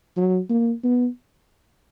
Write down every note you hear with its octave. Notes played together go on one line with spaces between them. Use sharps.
F#3
A#3
B3